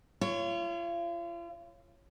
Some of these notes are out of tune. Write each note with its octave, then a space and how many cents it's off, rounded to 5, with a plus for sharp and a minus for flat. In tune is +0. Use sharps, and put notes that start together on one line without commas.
F4 -40 C#5 +0